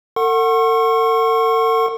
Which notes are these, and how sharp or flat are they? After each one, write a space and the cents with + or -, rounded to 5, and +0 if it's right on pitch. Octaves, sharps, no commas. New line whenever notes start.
A4 +45 F#5 +0 C#6 -40